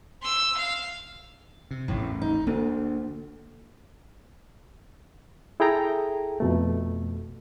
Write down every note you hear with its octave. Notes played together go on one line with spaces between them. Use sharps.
C6 E6
F5
C3
A1 E2 A2
D#4
D2 A#3 D4
E4 G#4 A4 G5 A#5
F2 B2 A3